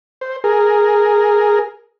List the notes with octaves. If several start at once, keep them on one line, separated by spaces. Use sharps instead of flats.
C5
G#4 A#4